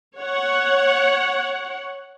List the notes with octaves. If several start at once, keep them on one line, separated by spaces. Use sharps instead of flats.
C#5 F#5